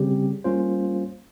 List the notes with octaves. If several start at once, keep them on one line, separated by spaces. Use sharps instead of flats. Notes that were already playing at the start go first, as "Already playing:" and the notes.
Already playing: C#3 G3 C4 G4
G3 A#3 C#4 F4 C5